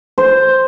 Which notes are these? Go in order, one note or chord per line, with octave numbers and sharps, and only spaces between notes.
C5